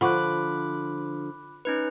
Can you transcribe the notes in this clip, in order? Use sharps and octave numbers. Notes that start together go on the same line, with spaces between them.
D3 F3 F4 F#5 B5 C#6 D6 F#6
C#4 D#4 B4